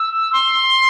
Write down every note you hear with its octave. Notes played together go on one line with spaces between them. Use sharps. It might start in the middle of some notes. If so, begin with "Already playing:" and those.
Already playing: E6
C6